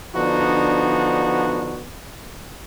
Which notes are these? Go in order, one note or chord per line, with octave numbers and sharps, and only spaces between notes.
D3 F3 B3 D4 D#4 F#4